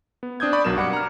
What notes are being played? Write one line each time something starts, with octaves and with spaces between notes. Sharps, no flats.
B3
C4 D4 D#6 G6 G#6
D5 B5 C#6 D6
B1 F#3 D4 A#4 E7
G2 F#5 B5 D6 C#7
A#5 F6